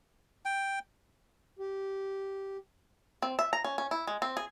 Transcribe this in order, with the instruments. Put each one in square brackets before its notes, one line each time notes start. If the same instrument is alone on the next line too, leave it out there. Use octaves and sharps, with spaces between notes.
[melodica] G5
[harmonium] G4
[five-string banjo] C4
E5
A#5
C#4
C#4
E4
G#3
C4
G#4